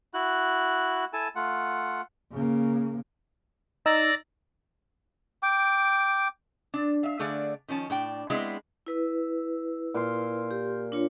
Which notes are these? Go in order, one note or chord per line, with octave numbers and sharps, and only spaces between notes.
E4 F#4 F#6
E4 A4 G#5 A5
A3 F4 F#5
C#3 A#3
D#4 D5 E6 A#6
G5 D6
D4
E5 F5
D3 A3 D4 G#4 D5 F5
D#3 F3 C#4 A5
A2 D4 G5
G#3 B3 C4 D4 E4
E4 B4 E6
A#2 F5 C6
G4
D4 F4 C#5